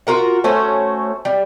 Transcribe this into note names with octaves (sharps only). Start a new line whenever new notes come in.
F4 F#4 A#4 F#5
A3 C#4 F#4 C5
G3